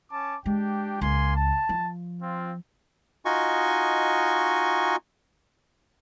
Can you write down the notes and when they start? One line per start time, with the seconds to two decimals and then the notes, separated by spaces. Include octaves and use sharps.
0.10 C#4 A5 D6
0.46 G#3 D4 G4 G5
1.01 C#2 A#3 G#5 C6
1.36 A5
1.69 F3
2.22 C4 F4
3.25 D#4 F4 F#4 D#5 G#5 C#6